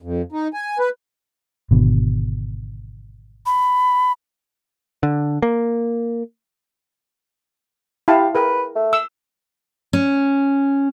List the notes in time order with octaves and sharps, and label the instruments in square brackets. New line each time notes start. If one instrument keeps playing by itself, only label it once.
[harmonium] F2
D#4
G#5
B4
[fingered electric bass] G#1 B2 D3
[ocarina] B5
[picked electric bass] D3
A#3
[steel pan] E4 F5 A5 [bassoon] G4
[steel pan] G#4 A#4 G5 [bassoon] B4
[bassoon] A3
[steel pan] E6
[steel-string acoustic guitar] C#4